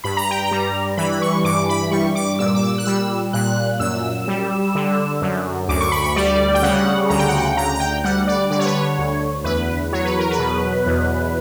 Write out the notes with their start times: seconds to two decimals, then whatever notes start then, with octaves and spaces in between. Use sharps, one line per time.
0.04 G2 B5
0.17 A#5
0.31 G5
0.45 A#5
0.51 G3
0.97 E3 B5
1.11 B5
1.22 C#6
1.44 G2 D6
1.69 B5
1.91 G3 C#6
2.15 D6
2.39 A#2 E6
2.54 D6
2.63 E6
2.78 F#6
2.86 G3 E6
3.33 A#2 F#6
3.80 F#2 E6
4.28 G3
4.75 D3
5.22 F#2
5.68 D2 D6
5.81 C#6
5.92 B5
6.04 C#6
6.16 G3 D5
6.54 G5
6.62 C#3 F#5
7.09 D2 A#5
7.19 G5
7.28 F#5
7.38 G5
7.56 D2 A#5
7.75 A#5
7.80 G5
8.04 G3 F#5
8.27 D5
8.50 D3 D5
8.59 C#5
8.66 B4
8.73 C#5
8.98 D2
9.44 E2 B4
9.93 F#3 C#5
10.05 B4
10.19 A#4
10.31 B4
10.38 B2
10.86 E2